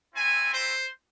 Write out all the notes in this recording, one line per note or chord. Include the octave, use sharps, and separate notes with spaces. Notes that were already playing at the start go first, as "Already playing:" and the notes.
A3 C4 E4 G#5
C5